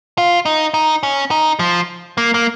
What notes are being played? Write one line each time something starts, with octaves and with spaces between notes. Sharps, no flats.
F4
D#4
D#4
C#4
D#4
F3
A#3
A#3